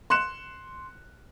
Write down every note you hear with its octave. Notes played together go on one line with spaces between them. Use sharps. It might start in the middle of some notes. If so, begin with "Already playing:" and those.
C6 F#6 C#7 E7